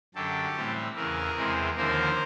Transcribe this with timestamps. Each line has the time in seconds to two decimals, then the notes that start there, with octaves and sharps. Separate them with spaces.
0.15 F#2 D3 F#3 G4 A4
0.56 A2 E3 G3 C4
0.96 E2 C#3 E3 G#4 A#4
1.37 E2 C3 E3 G#3 C4
1.77 D#2 D3 F3 A#3 A#4 C5